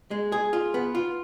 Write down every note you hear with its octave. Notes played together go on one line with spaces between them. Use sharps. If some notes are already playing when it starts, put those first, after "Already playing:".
G#3
G#4
F4
B3
F4